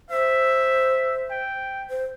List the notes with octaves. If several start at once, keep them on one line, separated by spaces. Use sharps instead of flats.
C5 E5
G5
C5